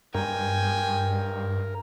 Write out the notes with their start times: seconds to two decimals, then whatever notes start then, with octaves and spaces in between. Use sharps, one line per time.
0.14 G2 A#4 G5 G#5